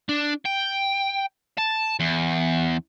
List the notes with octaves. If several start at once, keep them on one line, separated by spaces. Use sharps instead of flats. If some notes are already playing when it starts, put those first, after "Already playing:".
D4
G5
A5
E2